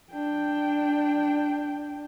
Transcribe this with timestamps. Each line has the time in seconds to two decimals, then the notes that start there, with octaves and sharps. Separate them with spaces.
0.12 D4 G5